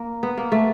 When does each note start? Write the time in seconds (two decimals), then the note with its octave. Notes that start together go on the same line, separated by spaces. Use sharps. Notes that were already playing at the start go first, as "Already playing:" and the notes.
Already playing: A#3
0.23 B3
0.37 A#3
0.52 A3